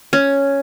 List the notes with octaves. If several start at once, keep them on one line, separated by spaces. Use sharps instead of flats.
C#4